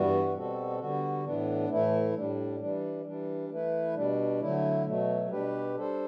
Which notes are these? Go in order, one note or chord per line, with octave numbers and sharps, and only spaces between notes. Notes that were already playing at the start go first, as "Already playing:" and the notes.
Already playing: G2 E3 G3 B3 F#4
B2 G3 C4 F#4 A4
D3 G3 B3 F#4
A2 E3 B3 D4
A2 E3 A3 E4
A2 G3 D4
E3 G3 D4
E3 G3 D4
E3 A3 E4 B4
B2 G3 D4
D3 F#3 A3 E4
B2 F#3 A3
B2 G3 D4 G4 B4
G3 D4 A4 C5